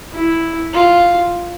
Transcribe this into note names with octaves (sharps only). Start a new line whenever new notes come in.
E4
F4